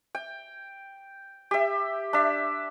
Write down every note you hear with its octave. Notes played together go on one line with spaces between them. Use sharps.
G5
G4 E5
D4 E5